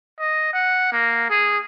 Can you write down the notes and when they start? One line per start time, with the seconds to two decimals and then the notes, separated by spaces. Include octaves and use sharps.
0.19 D#5
0.53 F#5
0.93 A#3
1.30 G#4